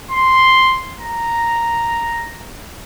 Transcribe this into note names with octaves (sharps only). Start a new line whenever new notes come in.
C6
A#5